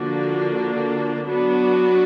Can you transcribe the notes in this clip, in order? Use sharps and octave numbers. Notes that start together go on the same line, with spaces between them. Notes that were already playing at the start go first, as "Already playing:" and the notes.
Already playing: D3 F3 A#3 D4 F#4
F#3 B3 D4 F#4